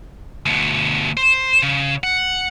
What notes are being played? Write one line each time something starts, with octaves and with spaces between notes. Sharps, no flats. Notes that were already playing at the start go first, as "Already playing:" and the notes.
D2 B2
C5
C#3
F#5